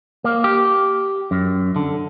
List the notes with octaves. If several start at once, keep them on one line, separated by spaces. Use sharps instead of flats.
A#3
G4
F#2
D3